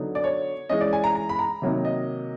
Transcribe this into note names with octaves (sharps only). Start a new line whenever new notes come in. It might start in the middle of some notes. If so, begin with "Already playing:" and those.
Already playing: D3 F#3 B3 D#4
D5
C#5
E3 G#3 C#4 D#5
D5
G#5
A#5
A#5
B5
A#5
C3 D#3 F#3 A#3 D#4
D#5